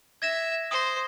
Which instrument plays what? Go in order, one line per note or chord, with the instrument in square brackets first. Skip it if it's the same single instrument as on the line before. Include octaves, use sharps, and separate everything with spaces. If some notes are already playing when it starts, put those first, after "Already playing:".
[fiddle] E5 [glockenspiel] G#6 A#6 E7
[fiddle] C5 [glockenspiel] D#6 A#6